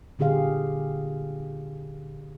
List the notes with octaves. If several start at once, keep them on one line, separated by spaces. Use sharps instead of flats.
A#2 D3 G4 G#4 F5